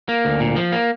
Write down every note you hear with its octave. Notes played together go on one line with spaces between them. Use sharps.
A#3
D2
A#2
F3
A#3